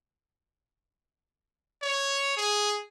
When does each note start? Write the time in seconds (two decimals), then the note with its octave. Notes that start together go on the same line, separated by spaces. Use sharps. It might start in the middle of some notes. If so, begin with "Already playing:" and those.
1.83 C#5
2.37 G#4